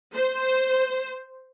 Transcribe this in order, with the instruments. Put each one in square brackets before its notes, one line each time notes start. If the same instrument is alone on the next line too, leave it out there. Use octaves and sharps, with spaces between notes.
[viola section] C5